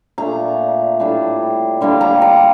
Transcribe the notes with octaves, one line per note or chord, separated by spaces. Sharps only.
A#2 A3 D4 A#5
A2 G3 D4
D3 G3 A#3 D4
A#5
A#5